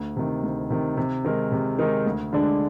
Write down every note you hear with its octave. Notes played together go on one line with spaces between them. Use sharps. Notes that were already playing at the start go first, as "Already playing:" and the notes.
Already playing: D2
C3 D#3
D2
C3 D#3
C3
D#3 G#3 D#4 A#4
C3
D#3 G#3 D#4 A#4
D2
D3 G#3 D4